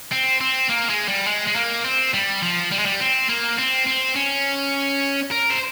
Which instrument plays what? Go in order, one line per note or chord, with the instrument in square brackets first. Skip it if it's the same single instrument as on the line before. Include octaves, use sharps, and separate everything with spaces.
[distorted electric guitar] C4
C4
A#3
G#3
G3
G#3
G#3
A#3
C4
G3
F3
G3
G#3
G3
C4
A#3
C4
C4
C#4
A#4
C5